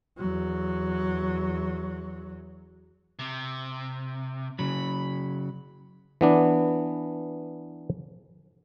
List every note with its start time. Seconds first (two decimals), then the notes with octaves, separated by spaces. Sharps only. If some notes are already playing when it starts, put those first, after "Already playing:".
0.17 E2 F#3
3.19 C3
4.59 C#3 F#3 B5
6.21 E3 B3 D4